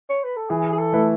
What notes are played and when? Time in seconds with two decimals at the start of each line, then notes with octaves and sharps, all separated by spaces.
0.10 C#5
0.24 B4
0.37 A4
0.50 E3 G#4
0.72 G#4
0.79 A4
0.93 A3 E4 B4